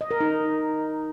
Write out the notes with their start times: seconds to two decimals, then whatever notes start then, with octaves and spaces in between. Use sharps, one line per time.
0.01 D#5
0.11 A#4
0.20 D#4